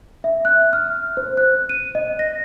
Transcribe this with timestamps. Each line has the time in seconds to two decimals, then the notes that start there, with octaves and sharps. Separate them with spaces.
0.24 E5
0.45 F#6
0.73 F6
1.17 C5
1.37 F#6
1.69 D#7
1.95 D#5
2.19 A#6